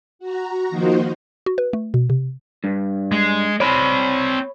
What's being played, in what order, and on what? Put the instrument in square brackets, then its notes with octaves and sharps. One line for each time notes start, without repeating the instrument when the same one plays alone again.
[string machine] F#4 A#5
D#3 F3 A#3 D#4 F#4 C5
[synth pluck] F#4
B4
A3
B2
C3
[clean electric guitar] G2
[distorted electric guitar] G#3
[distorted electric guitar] C4 D5 [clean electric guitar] C#5 B5